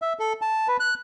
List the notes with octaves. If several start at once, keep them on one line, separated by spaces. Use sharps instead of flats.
E5
A4
A5
B4
F#6